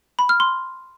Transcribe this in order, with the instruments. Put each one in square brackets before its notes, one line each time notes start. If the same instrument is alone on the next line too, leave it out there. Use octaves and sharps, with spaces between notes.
[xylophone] B5
F6
C6